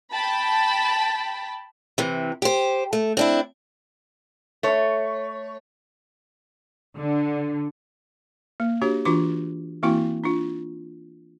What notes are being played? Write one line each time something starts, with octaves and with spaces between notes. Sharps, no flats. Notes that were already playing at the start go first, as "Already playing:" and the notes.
G5 A5 B5
C3 E3
G4 C5
A3
C4 D4 E4
A3 C#5
D3
A#3
D4 F#4 G4 C#5
E3 D4 F4 F#4 D6
E3 A#3 C4 E4 F#4 G5
D4 F4